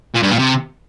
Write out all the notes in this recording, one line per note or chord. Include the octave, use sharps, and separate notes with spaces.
A#2
G2
A#2
C3